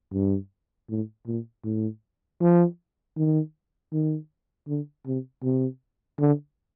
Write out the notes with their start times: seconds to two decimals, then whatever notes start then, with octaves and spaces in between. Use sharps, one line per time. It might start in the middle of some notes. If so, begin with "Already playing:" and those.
0.13 G2
0.89 A2
1.27 A#2
1.64 A2
2.41 F3
3.17 D#3
3.93 D#3
4.68 D3
5.06 C3
5.44 C3
6.20 D3